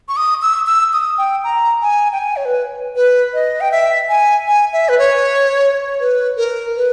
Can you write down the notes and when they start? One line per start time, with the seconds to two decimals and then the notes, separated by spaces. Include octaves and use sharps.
0.09 C#6
0.17 D#6
0.42 E6
0.67 E6
0.93 D#6
1.18 G5
1.44 A#5
1.82 G#5
2.12 G5
2.19 G#5
2.36 C#5
2.45 B4
2.96 B4
3.34 D#5
3.61 G5
3.71 E5
4.09 G#5
4.48 G#5
4.73 E5
4.89 B4
4.99 C#5
6.00 B4
6.37 A#4
6.76 B4